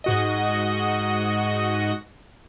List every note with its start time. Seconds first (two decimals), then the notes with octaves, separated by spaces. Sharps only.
0.04 G#2 F#4 D#5